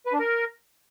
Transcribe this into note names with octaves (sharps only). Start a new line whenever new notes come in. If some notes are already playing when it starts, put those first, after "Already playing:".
B4
D4
A#4